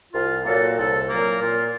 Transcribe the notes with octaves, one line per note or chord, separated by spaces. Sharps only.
C2 F4
A#2 F#3 A#3 A4
C2 A4
A#2 F#3 A#3
A#2 F4